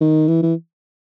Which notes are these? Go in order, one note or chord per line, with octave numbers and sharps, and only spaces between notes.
D#3
E3
E3